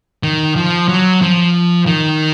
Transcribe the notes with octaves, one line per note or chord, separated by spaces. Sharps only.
D#3
F3
F#3
F3
D#3